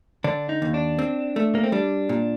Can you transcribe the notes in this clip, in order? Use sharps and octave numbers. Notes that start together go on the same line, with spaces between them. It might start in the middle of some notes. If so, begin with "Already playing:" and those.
D3 D4
D#4
D#2
D4
C4
A3
A#3
C4
G3 D4
A#2